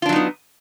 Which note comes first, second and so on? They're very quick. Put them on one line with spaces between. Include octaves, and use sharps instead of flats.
F4 D4 F#3 D#4 B3